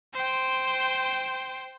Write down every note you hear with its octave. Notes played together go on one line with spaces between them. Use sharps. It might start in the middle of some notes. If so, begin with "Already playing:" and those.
C5 G5